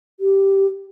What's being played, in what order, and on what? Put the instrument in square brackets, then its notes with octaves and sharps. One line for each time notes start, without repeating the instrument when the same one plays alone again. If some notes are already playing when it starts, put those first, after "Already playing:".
[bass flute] G4